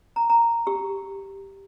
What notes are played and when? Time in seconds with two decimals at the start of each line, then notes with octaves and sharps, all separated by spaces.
0.16 A#5
0.30 A#5
0.67 G4